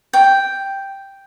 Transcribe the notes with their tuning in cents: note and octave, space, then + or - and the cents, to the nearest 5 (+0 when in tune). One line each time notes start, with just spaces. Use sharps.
G5 +0